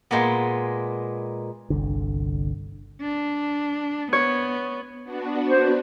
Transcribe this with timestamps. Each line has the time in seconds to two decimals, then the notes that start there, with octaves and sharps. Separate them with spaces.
0.11 A#2 G#3 A#3 B3
1.70 G1 C2 D3
3.02 D4
4.13 B3 C#5
5.04 B3 D4 F#4
5.48 C5